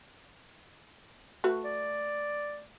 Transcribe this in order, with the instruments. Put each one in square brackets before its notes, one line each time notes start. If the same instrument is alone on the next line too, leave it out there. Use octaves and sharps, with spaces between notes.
[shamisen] A3 F#4 B4
[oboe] D5